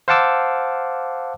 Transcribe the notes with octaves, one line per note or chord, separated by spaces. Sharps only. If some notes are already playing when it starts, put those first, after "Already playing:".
C5 F5 F#5 A5 D6 E6